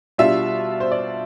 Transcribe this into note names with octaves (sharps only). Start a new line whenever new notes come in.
B2 G3 D4 F4 E5
C5
D5